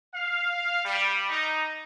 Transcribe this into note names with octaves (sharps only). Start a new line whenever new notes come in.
F5
G3
D#4